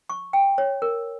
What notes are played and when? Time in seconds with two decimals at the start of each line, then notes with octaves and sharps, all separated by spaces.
0.10 C#6
0.33 G5
0.58 C#5
0.82 A#4